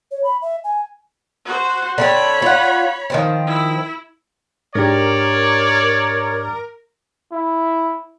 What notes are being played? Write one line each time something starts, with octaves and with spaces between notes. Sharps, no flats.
C#5
B5
E5
G#5
F#4 C5
D3 C4 A4 C#5 B5
F4 F#5
D#3 F3 C4
E4
G#2 D4 G4 A#4 C#5 D5
E4